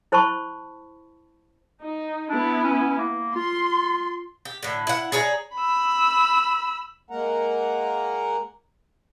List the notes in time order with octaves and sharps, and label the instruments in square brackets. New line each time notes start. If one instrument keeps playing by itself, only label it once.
[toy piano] E4 C5 A5 B5 C#6
[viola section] D#4
[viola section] B3 E4 [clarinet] D4
[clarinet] C#4
A#3
[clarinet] F4 [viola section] C6
[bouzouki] G4
A2 D3
E4 F#5
G#4 C#5 D5 A#5
[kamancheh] B5 E6
[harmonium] G#3 A#3 A#4 F#5 A#5